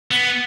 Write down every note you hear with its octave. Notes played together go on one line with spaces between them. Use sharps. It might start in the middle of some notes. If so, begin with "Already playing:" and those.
B3